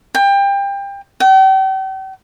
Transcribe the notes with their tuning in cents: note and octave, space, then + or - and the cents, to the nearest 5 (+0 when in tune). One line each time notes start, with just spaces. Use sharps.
G5 +25
G5 -40